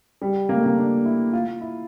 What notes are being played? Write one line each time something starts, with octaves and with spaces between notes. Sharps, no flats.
G3
A#3
A3
A#3
D4
E4
F4
E4